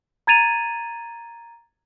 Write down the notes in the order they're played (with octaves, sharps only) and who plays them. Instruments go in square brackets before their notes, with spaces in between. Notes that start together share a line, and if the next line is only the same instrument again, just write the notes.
[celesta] A#5 G#6 A6 D#7 F7